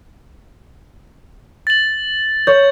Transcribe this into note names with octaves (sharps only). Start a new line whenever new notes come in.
A6 F#7
C#5 G6